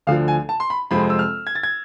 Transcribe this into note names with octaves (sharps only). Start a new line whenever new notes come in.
D2 D3 F3 F5
G#5
A5
C6
B5
F2 C3 F3 G#3 C4 B5
E6
F6
G#6
A6
G#6